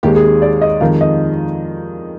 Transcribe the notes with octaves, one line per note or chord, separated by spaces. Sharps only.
D#2 D#3 G#3 G4
G#4
D5
D#5
F2 D#3 G#3 F5
D#5